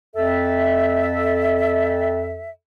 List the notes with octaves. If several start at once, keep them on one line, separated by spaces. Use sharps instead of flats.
F2 A4 E5